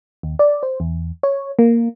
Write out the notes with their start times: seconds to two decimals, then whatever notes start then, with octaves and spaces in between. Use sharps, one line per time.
0.23 D#2
0.39 D5
0.63 C5
0.80 E2
1.23 C#5
1.59 A#3